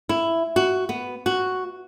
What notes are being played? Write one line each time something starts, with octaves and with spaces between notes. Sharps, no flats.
E4
F#4
B3
F#4